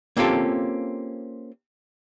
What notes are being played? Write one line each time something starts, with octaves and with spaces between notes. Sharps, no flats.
A#3 C4 C#4 F4 G4 A4